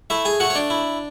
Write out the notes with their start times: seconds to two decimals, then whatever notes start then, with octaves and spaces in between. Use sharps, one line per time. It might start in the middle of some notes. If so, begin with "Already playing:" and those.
0.10 A3 E4 E5
0.25 G#4 G#5
0.40 A3 F#4 F#5
0.50 C#5
0.55 D4 D5
0.70 E4